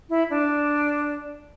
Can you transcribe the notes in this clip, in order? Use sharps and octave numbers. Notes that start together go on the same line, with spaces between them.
E4
D4